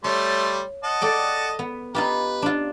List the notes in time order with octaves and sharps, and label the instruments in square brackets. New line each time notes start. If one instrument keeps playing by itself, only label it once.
[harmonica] G3 A3 C6 [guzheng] C#5
[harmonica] D#5 F#5 A5
[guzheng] A4 D5 G5
B3
[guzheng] D#4 F4 G4 [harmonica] B4
[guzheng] D4 F4